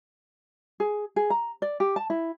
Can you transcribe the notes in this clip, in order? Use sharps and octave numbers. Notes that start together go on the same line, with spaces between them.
G#4
G#4
A#5
D5
G4
A5
E4